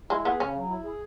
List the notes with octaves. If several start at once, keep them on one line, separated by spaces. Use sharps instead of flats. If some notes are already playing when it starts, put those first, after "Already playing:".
G#3 E4
B3 G#4
C#3 C#4
F#3
E4
G#4